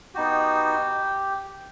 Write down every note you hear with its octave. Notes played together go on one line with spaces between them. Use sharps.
B3 D#4 F#4 G4